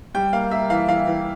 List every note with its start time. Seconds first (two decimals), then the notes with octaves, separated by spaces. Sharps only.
0.14 G3 G5
0.33 A#3 F5
0.51 A#3 E5
0.70 E3 F5
0.88 E3 F5
1.07 E3